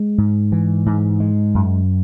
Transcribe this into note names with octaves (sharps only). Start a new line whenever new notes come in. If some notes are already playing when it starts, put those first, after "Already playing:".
Already playing: G#3
G#2
E3
G#2
G#3
F#2